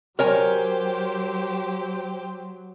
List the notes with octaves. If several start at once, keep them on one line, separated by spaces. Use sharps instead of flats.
F#3 G4 A#4 C5 C#5 G#5